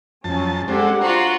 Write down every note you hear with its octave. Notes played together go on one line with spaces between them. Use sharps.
F2 F#3 C#4 A5
G3 G#3 C4 D4 G4 A4 F#5
F4 F#4 C5 A#5